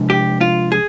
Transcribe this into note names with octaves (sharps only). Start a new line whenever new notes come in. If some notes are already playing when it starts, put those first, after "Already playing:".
Already playing: C3 F3 G#3 D4
G4
F4
G#4